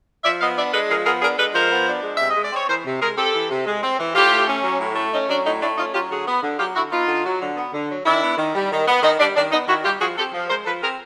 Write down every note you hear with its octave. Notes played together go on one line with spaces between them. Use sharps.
F3 D5 E5
B3 D#5 F5
D4 D5 E5
G#3 A4 B4
F3 G#4 A#4
B3 G#4 A#4
D4 G#4 A#4
G#3 A4 B4
F3 A#4 C5
B3
D4
G#3
C3 E5
D#5
G#3
D5
C4 C#5
E3 A#4 C5
C3
G#3 G#4 A#4
C4 G4 A4
E3
C3
G#3
C4
E3
A2 F4 G4
A3
C#4
F#3
A2
A3
C#4 D#4
F#3 D4
A2 D#4
A3 D4 E4
C#4 D#4 F4
F#3 F4 G4
D3 F#4 G#4
B3
D3
F#3 F4 G4
D3 E4 F#4
B3 D#4 F4
D3
F#3
D3
B3
D3
F#3
D#3 D4 E4
B3
D#3
G3
D#3
B3
D#3 D#4
G3 D4
D#3 D4
B3 D#4
D#3 E4 F#4
G3 F4 G4
F3 F#4 G#4
C4 G4 A4
F3
G#3 A#4 C5
F3 A4 B4
C4 G#4 A#4